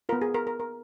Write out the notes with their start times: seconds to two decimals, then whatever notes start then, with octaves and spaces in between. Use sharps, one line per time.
0.09 B3 F4 A#4
0.22 G#4
0.34 A#4
0.47 A#4
0.60 A#4